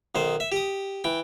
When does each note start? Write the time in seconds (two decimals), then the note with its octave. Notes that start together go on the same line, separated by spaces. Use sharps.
0.15 B1 D#3 C5
0.40 E5
0.52 G4 D#6
1.04 E3 G5